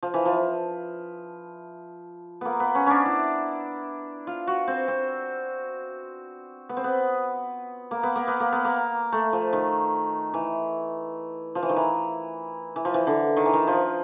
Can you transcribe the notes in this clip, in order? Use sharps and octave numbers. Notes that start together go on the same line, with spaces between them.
F3
E3
F3
A#3 B3
B3
C#4
C#4 D4
E4
F4
F#4
C4
C4
B3
C4
B3
A#3
B3
A#3
B3
A#3
B3
A#3
A3
F3
D#3
E3
F3
E3
D#3
E3
E3
F3
E3
D3
D#3
E3
D#3
F3